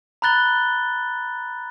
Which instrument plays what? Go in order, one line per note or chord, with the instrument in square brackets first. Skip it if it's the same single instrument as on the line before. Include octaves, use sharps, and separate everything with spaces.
[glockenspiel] A#5 B5 F#6 A6 G7